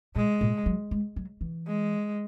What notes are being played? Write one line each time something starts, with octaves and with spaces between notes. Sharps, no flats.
A#2 G#3
A#2
F#3
G#3
F#3
E3
G#3